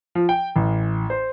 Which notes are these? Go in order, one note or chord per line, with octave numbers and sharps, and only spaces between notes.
F3
G5
A1
C5